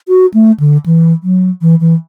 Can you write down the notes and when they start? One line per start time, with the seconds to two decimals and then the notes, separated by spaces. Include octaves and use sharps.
0.08 F#4
0.34 A3
0.60 D3
0.86 E3
1.23 F#3
1.62 E3
1.80 E3